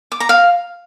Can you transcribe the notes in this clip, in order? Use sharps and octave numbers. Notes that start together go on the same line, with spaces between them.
D6
A#5
F5